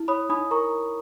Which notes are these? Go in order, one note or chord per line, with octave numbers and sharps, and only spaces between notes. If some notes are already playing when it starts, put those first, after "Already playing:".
Already playing: E4
C#5 B5 D#6
D#4 B5 D#6
A#4 A#5 C#6